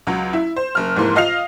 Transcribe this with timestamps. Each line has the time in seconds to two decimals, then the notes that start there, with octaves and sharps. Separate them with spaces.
0.07 C#2 F#3
0.33 E4
0.56 C5
0.75 F#1 F6
0.95 F1 G#2 E3 A#3 C6
1.15 F4 D#5 F5 F6 C7 F7